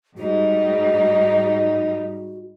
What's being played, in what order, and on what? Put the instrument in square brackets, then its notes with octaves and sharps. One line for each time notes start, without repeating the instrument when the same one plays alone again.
[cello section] G#2 G3 D#4 [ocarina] F#4